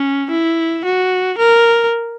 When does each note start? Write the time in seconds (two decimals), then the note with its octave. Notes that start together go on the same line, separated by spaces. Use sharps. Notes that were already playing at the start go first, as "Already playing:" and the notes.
Already playing: C#4
0.31 E4
0.85 F#4
1.38 A#4